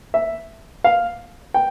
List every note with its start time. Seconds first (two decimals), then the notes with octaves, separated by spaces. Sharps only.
0.14 E5
0.84 F5
1.54 G5